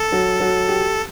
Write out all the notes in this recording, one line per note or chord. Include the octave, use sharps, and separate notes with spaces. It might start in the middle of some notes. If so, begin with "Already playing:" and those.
Already playing: A4
F#3
F#3
G4